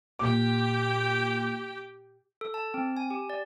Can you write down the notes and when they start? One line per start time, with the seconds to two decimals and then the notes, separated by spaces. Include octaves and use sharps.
0.19 A#2 G4 G5 D6
2.41 A4
2.54 A5
2.74 C4
2.97 G#5
3.10 G4
3.30 D5